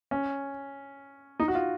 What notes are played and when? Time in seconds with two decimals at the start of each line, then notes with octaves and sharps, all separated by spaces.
0.11 C#4
1.40 D#4
1.48 F#4
1.55 F4